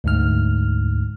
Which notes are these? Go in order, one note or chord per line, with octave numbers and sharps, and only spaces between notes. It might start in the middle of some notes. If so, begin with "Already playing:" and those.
D2 G#2 F6